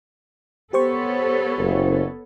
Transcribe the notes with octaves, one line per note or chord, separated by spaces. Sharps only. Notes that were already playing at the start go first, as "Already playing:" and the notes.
B3 G4 A4 C5 C#5 C#6
F#1